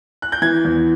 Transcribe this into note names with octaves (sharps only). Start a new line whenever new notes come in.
F#6
G6
E3 G#6
E2